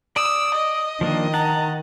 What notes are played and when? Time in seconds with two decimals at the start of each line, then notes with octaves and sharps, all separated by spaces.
0.16 D5 D#6 E6
0.54 D#5
1.01 D#3 F3 A#3 D4
1.34 F#5 A5 A#5